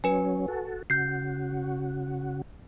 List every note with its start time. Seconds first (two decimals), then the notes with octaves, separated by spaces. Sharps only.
0.04 F#3 C#4 B4 G#5
0.48 F#4 A4
0.90 C#3 F#4 G6 C7